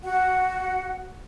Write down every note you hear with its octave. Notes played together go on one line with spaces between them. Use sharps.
F#4 F#5